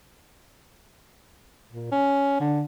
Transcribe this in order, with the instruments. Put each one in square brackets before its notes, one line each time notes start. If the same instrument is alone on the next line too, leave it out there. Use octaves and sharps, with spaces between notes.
[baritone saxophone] A#2
C#4
D3